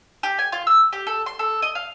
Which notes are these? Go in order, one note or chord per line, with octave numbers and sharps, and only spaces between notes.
G4
G#5
F4
E6
G4
A4
C6
A4
D#5
F5